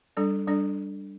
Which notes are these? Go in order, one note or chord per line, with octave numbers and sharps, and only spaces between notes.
G3 D4 A4 D5
G3 D4 A4 D5